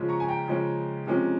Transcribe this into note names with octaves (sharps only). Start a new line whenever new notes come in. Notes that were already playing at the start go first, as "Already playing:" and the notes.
Already playing: C#3 F3 G#3 C#4
A#5 C#6
G#5
G5 A#5
C#3 F3 G#3 C#4
C3 F3 G#3 C#4